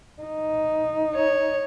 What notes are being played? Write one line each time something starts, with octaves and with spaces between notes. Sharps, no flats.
D#4
C#5